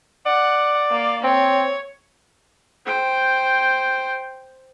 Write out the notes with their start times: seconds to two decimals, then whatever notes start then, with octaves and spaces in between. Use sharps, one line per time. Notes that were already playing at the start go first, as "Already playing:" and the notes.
0.26 D5 F#5
0.91 A#3 F5
1.24 C4 C#5
2.86 C5 G5